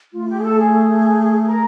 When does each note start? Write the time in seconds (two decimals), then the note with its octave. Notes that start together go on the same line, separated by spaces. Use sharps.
0.13 A3 F4
0.28 G4
0.38 G#4
0.42 A4
0.57 G#4
1.46 A#4